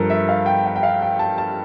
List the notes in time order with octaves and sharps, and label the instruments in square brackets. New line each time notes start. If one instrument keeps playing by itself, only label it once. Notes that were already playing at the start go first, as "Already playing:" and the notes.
Already playing: [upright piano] G2 F3 A4 A#4
E5
F5
G5
G5
G5
F5
G5
A5
A5